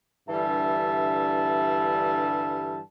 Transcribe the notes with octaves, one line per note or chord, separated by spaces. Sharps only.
G2 D3 E3 G3 E5 A5